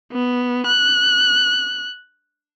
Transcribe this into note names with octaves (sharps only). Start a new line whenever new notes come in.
B3
F#6